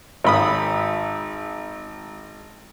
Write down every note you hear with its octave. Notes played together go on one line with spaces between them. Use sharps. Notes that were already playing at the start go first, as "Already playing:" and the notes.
G#1 B5 D#6